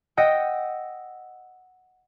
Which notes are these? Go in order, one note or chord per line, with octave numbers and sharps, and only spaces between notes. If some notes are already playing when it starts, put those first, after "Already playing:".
D#5 F#5 G5 E6